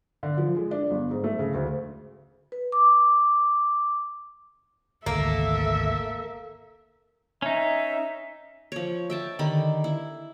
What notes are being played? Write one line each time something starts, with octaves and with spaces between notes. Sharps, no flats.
D3
F3
G#3
D4
G1
G#2
A3
C#3
D2
B4
D6
G#1 D2 C3 A#3 A4 E5
C#4 D#4 E5
F3 C#5
E5 G5 A5
D3 D#3 G4 B5
E4